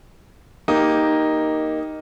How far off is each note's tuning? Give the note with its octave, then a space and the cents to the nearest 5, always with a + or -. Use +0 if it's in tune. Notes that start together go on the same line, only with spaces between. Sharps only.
A#3 +0 D#4 +0 G4 +0